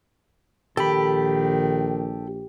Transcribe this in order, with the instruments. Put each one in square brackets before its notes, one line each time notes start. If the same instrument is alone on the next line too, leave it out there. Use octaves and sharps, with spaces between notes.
[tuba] A#1 [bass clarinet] D#3 [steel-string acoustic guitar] G4 [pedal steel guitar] A4 B5